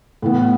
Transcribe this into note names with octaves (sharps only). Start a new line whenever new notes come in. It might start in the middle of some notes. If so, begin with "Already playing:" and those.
A2 E3 B3